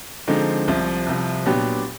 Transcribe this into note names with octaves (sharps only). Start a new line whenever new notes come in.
D3 F3 G#3 C4 D#4
C2 C3 F3
C2 C3 F3
A#2 F#3 B3 D4 G4